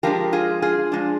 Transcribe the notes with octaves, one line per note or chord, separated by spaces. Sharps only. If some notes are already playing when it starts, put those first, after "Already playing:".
F3 G#3 D4 G4 A#4
F4 G#4
F4 G#4
F3 G#3 D4